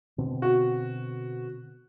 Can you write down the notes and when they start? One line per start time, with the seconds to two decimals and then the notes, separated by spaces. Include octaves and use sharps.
0.18 B2 D3 C4
0.42 F#4